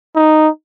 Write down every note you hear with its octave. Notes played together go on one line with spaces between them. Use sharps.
D#4